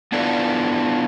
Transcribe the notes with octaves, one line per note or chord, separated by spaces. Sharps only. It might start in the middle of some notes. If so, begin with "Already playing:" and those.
B3 D4 E4 F4 A4 B4